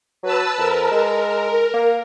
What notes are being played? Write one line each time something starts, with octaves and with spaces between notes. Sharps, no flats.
F#3 B4 A5 E6
F2 A#4
G#3
A#3